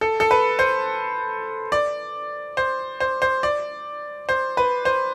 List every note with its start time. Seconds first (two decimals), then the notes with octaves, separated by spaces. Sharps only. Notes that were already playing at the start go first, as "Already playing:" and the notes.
0.01 A4
0.20 A4
0.31 B4
0.59 C5
1.72 D5
2.57 C5
3.00 C5
3.22 C5
3.43 D5
4.29 C5
4.57 B4
4.85 C5